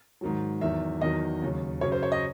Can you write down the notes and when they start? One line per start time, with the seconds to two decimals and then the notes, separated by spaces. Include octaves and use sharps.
0.21 G#2 D#3 F#3
0.61 E2 D#3 F#3 E5
1.01 E2 D#3 F#3 D#5
1.42 D#2 C#3 F#3
1.81 F#2 C#3 F#3 C#5
1.92 C5
2.03 C#5
2.12 D#5